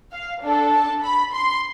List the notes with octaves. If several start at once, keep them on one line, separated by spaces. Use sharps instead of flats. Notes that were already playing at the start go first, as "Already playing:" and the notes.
F5
D4 A4
A5
B5
C6